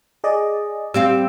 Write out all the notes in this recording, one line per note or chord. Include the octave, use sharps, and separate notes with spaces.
G#4 D5 D#5
G3 C4 F5 E6